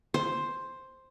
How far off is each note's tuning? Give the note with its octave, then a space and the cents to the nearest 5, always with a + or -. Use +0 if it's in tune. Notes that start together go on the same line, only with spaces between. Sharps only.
C5 +5